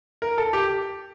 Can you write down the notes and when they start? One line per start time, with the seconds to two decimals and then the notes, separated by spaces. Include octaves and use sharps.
0.22 A#4
0.38 A4
0.53 G4